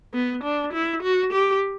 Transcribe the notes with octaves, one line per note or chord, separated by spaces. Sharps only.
B3
D4
E4
F#4
G4